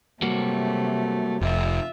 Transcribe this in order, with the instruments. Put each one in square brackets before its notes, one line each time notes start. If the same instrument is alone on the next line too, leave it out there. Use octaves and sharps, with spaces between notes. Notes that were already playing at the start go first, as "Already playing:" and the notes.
[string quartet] C3 F#3 A3 [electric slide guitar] G3 A#3 F#4
[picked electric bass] F1 [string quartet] F4 E5